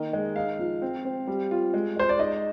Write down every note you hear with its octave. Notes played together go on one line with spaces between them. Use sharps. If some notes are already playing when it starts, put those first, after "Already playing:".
Already playing: D#3 A#3 A#4 D#5
G#3
D#4 F5
F3
C4
C4
G3
F4
G#3
G#3 C5
D5
D#4 D#5